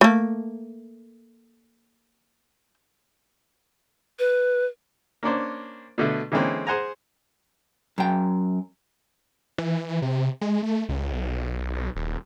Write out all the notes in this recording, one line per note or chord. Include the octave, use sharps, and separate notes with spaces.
A3 A#3
B4
A#3 C#4 D4 C5
B2 D3 A3
D3 E3 G#3 A#3 C4 C#4
G#4 C5 F#5 G#5 A#5
F#2 G5
E3
C3
G#3
A3
C#2
B1
D#1